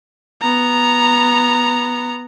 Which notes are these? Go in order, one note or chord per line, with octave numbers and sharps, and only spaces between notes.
B3 A#5